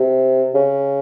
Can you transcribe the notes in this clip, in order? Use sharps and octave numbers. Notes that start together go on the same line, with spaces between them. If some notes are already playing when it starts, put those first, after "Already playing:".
Already playing: C3
C#3